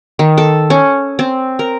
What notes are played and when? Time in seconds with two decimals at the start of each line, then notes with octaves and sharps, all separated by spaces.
0.19 D#3
0.38 A4
0.70 C#4
1.19 C4
1.59 A#4